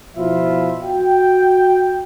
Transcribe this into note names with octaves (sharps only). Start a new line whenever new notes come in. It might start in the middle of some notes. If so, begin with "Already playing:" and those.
B2 F3 E4 F4 E5
F#4 G5